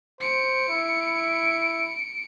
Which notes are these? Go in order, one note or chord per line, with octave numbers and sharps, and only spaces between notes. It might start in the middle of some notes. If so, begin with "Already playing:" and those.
C5 C#7 D7
E4